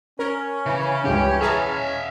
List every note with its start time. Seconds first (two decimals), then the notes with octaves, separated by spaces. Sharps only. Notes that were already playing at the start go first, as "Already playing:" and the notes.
0.19 C#4 A#4
0.66 C#3 E3
1.05 C#2 G2 C#3 E3 G4
1.41 G#4 E5 F5 A5 A#5